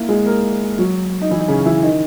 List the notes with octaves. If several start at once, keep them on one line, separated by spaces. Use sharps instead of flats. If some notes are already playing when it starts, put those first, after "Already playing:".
Already playing: A#3 E4 A#4 E5
G#3 G#4
A#3 A#4
F#3 F#4
D#4
E3 E4
D#4
C#3 C#4
E3 E4
D#3 D#4